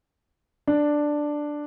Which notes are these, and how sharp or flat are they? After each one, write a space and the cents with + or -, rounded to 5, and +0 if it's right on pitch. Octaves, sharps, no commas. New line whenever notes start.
D4 +5